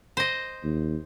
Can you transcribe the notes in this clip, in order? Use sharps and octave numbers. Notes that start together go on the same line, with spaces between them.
C5 D#5
D#2